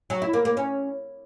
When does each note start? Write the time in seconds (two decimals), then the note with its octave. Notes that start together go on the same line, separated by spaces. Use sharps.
0.10 F#3
0.22 E4
0.33 A#3
0.45 A#3
0.57 C#4